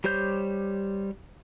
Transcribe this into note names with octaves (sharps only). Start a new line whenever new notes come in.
G3 G4 C5 C#5 G6